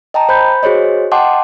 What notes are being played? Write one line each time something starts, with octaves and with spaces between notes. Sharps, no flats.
D#5 G5 A5 A#5
C5 B5 G6
F#4 G#4 C5 C#5 D#5
D#5 F#5 G5 A5 C6 D6